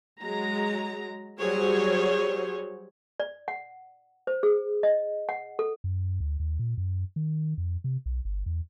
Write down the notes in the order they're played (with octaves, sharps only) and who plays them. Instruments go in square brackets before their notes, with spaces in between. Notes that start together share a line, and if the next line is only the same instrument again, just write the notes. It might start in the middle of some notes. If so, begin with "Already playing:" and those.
[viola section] F#3 G#3 A#5
F#3 G3 G#4 C5 C#5
[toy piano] D5
F#5
C5
G#4
D#5
F#5
A4
[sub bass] F#2
D2
D#2
A#2
F#2
D#3
F2
C3
B1
G1
E2